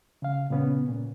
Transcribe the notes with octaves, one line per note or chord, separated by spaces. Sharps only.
C#3 F5
A#2 C#3 B3 C#4
A#2